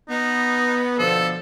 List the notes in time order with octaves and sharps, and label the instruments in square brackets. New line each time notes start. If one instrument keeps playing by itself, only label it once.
[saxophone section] B3 [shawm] D#4
[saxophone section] B2 D3 F3 [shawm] A4